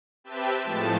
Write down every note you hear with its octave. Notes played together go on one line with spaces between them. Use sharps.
C4 G4 B4 E5 G5 A5
A2 F3 G#3 A3 A5